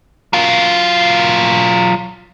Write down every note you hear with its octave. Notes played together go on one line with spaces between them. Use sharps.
F#3 F4